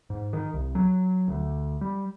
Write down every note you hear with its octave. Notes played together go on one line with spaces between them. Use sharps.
G#2
D#3
C2
F#3
D2
G3